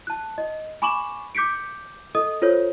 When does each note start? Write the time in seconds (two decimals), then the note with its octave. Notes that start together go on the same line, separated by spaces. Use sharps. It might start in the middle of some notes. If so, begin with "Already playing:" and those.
0.07 A5 F#6
0.38 D#5
0.82 G#5 B5 C#6 D6 E7 F#7
1.35 D6 G6 B6 C#7 D7
2.15 A4 D#5 D#6
2.42 F4 A4 C5 C#5